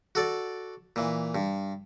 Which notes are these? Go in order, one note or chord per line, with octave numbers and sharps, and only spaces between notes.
F#4 A4 D5
A#2 E3
G2